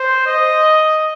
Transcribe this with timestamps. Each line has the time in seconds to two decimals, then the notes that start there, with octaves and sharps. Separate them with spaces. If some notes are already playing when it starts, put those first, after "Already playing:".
Already playing: C5
0.26 D#5